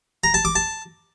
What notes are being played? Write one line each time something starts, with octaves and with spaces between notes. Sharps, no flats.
A#5
A5
D6
A5